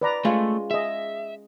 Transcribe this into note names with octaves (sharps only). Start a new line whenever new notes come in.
B4 D5 A#5
G#3 A3 C#4 F4
G#4 D#5 E5